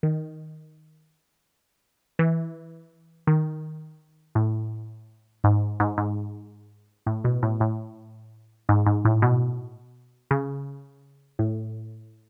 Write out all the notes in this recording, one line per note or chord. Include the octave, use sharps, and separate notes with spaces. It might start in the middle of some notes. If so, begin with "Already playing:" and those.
D#3
E3
D#3
A2
G#2
G#2
G#2
A2
B2
A2
A2
G#2
G#2
A2
B2
C#3
A2